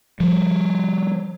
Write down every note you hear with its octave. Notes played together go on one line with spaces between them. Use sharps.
F3 G3